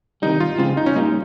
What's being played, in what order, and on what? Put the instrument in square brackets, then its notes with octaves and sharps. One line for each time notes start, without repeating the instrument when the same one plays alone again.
[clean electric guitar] C3 D#3 G3 [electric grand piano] D#4
[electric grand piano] F4
[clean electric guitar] C#3 F3 G#3 C4 [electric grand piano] F4
[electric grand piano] D#4
C#4
[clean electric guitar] A#2 G3 A#3 F4 [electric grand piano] D#4